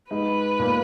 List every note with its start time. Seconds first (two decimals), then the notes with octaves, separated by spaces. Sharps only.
0.11 G#2 G#3 B4
0.59 A#2 A#3